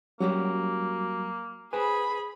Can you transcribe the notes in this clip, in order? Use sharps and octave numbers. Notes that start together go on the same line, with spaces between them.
F#3 G3 A#3 C#4 F#4 G4
G#4 B4 C5 G#5 B5